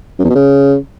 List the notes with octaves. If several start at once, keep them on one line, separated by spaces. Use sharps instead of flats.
F#2
E2
B2
C#3